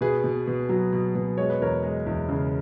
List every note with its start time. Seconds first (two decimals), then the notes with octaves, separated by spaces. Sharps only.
0.01 B2 G#4 B4
0.24 B2
0.47 B2
0.69 F#3
0.93 B2
1.15 B2
1.38 G#3 C#5
1.50 B4
1.61 E2 A#4 C#5
1.83 G#3
2.06 E2
2.29 C#3